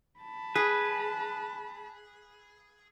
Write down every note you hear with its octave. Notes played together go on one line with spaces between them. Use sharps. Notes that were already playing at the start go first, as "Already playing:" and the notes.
A5 B5
G#4 B4